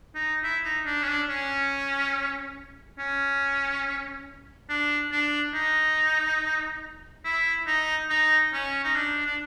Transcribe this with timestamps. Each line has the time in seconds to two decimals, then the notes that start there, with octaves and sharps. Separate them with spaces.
0.15 D#4
0.43 E4
0.65 D#4
0.86 D4
1.03 C#4
1.08 D4
1.29 C#4
2.99 C#4
4.69 D4
5.12 D4
5.54 D#4
7.24 E4
7.67 D#4
8.10 D#4
8.53 C#4
8.84 D#4
8.95 D4
9.26 D4